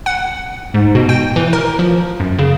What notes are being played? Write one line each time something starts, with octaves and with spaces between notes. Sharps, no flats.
F#5
G#2
B2
G5
E3
A#4
F3
F#2
C#3